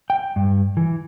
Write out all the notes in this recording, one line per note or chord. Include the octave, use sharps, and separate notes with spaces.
G5
G2
E3